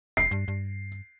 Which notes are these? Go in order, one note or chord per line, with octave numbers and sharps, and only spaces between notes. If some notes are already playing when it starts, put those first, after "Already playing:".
F1 C7
G2
G2